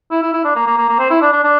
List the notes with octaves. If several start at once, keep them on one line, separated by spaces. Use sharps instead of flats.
E4
E4
E4
D4
A#3
A#3
A#3
A#3
C4
E4
D4
D4
D4